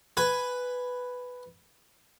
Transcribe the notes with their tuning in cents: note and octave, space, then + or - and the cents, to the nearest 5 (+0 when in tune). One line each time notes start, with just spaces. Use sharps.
B4 +5 G#5 +0